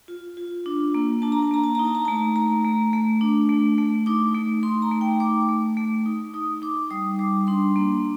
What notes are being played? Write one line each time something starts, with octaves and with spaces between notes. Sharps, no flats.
F4
F4
D4
A#3
D4 A5
A#5
A5
A#3 A#5
A5
D#4 A#5
A5
A#5
A3 A5
A3 A#5
A3
A3
D4
A3
A3
D#4 D6
A3
D#4 C6
A#5
A3
G5
A3 D6
A3
A3
D#4
D#4 D#6
D#4 D6
G3 D#6
G3 D6
D4 C6
A#3